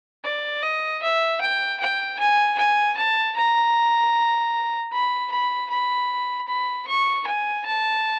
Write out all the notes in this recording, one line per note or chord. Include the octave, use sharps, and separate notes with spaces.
D5
D#5
E5
G5
G5
G#5
G#5
A5
A#5
B5
B5
B5
B5
C#6
G#5
A5